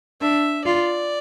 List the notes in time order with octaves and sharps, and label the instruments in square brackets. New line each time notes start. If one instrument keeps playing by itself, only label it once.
[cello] D4 [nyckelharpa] E5
[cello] F4 [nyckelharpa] D5